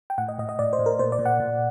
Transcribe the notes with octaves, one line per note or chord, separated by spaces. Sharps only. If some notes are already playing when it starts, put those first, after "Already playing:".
G5
A2 F#5
D#5
A2 D#5
D#5
A2 D5
C5
A2
A#4
A#2 C5
D5
A#2
F#5
A#2